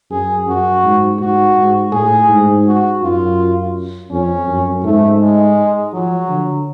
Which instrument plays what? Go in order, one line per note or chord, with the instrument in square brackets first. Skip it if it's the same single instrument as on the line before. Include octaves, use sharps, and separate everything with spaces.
[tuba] F#2 [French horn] G#4
[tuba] F#2 [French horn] F#4
[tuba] G#2
[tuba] G#2 [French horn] F#4
[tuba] G#2
[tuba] A2 [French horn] G#4
[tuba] G#2
[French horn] F#4
[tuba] F#2 [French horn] F4
[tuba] F2 [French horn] C#4
[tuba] F#2
[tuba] G#2 [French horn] A3
[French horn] G#3
[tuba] F3 [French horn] F#3
[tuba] D3